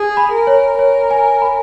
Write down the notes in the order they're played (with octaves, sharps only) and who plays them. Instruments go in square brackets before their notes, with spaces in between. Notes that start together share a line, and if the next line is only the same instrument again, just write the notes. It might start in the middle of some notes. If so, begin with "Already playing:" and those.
Already playing: [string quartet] G#4 [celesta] G#5
[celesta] B5
[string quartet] A#4
[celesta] C#5
[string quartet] A#4 [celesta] C#5
[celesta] G#5
B5